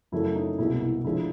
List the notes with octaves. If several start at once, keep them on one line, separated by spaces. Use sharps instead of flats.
F#2 C#3 F#3 A3 E4
D#4
C2 B2 G#3 E4
E4
D2 D3 F3 G#3 E4